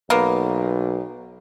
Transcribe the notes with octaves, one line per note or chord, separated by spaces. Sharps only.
B1 A#3 B3